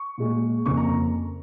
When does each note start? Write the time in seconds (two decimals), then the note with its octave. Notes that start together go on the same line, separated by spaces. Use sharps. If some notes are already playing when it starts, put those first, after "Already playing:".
Already playing: C#6
0.18 A#2 G#3
0.66 F2 C#3 A#3 C#6
0.77 A#5